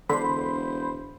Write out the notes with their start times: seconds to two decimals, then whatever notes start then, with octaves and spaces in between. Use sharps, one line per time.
0.09 E1 D3 C5 B5 C6